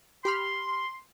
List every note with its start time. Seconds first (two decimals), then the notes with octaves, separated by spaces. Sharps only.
0.25 G4 B5 C6 F6